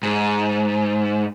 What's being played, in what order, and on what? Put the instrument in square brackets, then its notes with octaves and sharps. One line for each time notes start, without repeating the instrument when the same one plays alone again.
[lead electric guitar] G#2